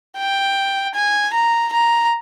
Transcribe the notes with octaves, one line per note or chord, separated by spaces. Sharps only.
G5
G#5
A#5
A#5